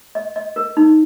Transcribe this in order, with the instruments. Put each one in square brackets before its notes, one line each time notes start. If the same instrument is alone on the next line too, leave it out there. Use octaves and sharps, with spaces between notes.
[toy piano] D#5
D#5
A#4
D#4